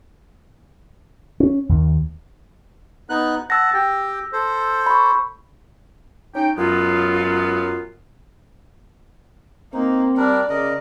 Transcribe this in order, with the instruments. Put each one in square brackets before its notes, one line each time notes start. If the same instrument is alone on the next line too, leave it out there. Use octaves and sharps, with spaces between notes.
[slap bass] C#4
D#2
[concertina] B3 D#4 F#6
[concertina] F#5 A5 [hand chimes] E6 A#6
[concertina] G4 G5
A4 C5
[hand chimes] B5 C#6
[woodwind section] C#4 D#4 G5
F#2 F#3 G#3 B3 F4
[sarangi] A#3 [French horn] C4 [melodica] D#4
[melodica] G3 D4 A#4 [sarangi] D5
[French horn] C#3 [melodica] A#4 D#5